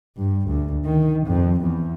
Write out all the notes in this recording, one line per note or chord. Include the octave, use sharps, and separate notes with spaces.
G2
D2
D#3
F2
E2